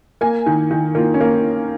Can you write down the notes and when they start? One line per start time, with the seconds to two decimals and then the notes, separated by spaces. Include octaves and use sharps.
0.21 A#3 G#5
0.46 D#3
0.71 D#3
0.95 A#3 F4
1.14 C#4
1.21 A#3